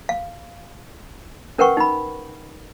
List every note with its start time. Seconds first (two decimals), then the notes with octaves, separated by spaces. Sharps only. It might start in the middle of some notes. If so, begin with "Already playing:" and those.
0.09 F5
1.58 C#4 A#4 B4 F#5 G5 C#6
1.77 D#4 B5